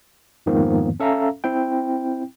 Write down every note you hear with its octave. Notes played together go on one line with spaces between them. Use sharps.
F2 G#2 D#3 F3 A#3 B3
C#4 A4 E5 F5 A#5
C4 E4 G5